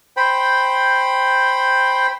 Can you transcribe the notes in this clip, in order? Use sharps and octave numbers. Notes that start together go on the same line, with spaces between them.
C5 G5 B5